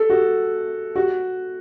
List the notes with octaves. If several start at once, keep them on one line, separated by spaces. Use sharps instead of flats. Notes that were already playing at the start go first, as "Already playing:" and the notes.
Already playing: A4
F#4
F#4